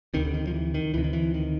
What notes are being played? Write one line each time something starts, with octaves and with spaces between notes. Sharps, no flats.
D2 C3 D#3
D3
D#3
F3
E3
D#3
D2 C3 E3
D#3
E3
D#3